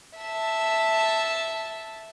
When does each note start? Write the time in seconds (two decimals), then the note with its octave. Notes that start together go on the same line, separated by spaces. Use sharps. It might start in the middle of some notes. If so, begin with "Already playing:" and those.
0.17 E5 A5